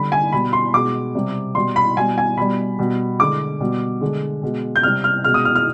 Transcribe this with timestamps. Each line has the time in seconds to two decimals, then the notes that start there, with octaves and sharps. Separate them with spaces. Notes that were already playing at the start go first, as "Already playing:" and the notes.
Already playing: D3 G3 B5
0.12 G#5
0.32 B2 G3 B5
0.53 C6
0.73 B2 G#3 D6
1.15 C3 G3
1.55 B2 G3 C6
1.76 B5
1.97 B2 G3 G#5
2.18 G#5
2.37 B2 G3 B5
2.79 B2 G3
3.20 D3 G#3 D6
3.60 B2 G3
4.01 D3 G#3
4.43 B2 G#3
4.76 G6
4.83 C3 G3 F6
5.04 F6
5.24 B2 G#3 F6
5.34 D#6
5.45 F6
5.55 F6